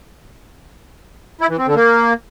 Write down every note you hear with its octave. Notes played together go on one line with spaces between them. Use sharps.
E4
E3
C4
D3
A#3